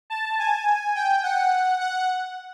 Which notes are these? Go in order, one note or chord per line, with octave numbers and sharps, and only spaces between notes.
A5
G#5
G5
F#5
F#5